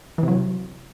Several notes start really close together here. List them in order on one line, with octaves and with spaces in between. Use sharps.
E3 C3 F#3